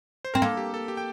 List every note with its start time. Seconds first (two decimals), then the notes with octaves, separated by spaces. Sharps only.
0.25 C5
0.34 C4 A#4
0.42 A#3 A4
0.57 G4
0.74 A4
0.88 G4
0.97 G5